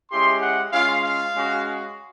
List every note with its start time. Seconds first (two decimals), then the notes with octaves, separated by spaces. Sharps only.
0.11 G#3 C#4 E4 G4 C6
0.42 F#5
0.72 G#3 C#4 F4 F5
1.04 F5
1.34 G#3 C#4 F#4